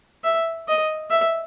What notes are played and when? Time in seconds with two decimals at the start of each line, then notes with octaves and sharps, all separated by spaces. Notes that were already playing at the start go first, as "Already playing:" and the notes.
0.24 E5
0.68 D#5
1.11 E5